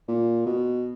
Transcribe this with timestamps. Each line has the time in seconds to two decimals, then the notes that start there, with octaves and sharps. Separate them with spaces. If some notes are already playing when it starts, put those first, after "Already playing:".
0.08 A#2
0.46 B2